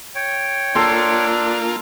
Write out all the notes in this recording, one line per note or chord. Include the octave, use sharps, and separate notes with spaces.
C#5 G5
A#3 D4 F4 A4 C6